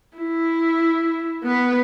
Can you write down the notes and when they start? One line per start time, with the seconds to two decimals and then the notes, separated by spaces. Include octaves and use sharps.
0.17 E4
1.43 B3 B4